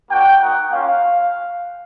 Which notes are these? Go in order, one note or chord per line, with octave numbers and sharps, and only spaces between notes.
A#3 D4 F#4 G5
A#3 D#4 F#4 F#5
A#3 C#4 F4 F5